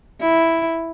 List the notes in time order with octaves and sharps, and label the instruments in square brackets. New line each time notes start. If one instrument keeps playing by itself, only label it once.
[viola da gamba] E4